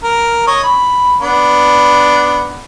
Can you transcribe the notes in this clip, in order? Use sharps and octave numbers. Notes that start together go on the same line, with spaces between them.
A#4
C#5 D#5
B5
B3 D4